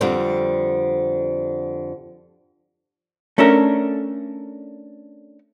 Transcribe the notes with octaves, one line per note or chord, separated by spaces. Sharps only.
F2 D3 G3 C4
A3 C#4 D4 A4 A#4